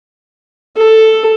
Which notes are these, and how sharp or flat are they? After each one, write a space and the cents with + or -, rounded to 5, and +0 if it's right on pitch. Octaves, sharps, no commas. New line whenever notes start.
A4 +5